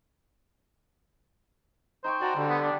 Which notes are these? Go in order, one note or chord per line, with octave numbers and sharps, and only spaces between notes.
D#4 C5 G5 C#6
F#4 D5 A5 A#5
D3 G3
B3
D4